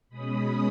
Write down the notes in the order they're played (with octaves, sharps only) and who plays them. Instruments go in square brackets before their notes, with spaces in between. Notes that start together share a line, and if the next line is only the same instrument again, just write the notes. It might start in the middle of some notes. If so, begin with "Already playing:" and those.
[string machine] B2 G#3 C#4 B5 D#6